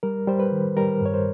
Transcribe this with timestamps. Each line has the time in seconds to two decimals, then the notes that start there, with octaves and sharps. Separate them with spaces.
0.03 G3 A#4
0.28 G3 C5
0.40 B4
0.52 D#3
0.77 G3 A#4
1.01 G2 C#5
1.14 C5